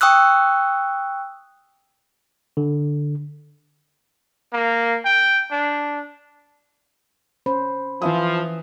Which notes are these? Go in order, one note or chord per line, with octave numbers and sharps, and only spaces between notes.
G5 C#6 D#6 E6 F#6
D3
A#3
G5
D4
C#4 C5 B5
E3 F3 E5 D#6